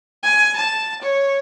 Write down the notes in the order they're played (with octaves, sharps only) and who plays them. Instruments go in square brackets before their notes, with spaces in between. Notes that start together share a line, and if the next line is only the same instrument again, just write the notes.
[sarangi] G#5
A5
C#5